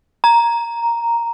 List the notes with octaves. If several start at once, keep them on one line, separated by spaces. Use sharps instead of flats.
A#5